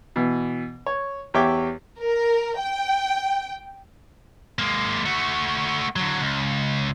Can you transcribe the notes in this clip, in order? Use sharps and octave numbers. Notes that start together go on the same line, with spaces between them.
B2 E3
C#5
E2 G4 C#5 E5 G5 D6
A#4
G5
G#3 A#3
A3 F#4
D3 F#3
C#2